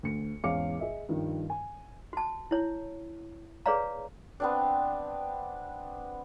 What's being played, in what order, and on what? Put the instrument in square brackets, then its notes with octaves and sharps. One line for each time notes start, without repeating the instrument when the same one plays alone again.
[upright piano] D2 C#7
E2 G#2 C#4 F5 D6 C#7
G#4 D#5 E5
G2 D#3 F3
G#5
[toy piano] F#4 A5
E4 C#5
G#4 B4 C#5 D5 F5 A#5
[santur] B3 C4 D4